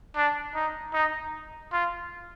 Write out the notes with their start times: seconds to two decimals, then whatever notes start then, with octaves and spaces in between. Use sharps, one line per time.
0.16 D4
0.55 D#4
0.93 D#4
1.72 F4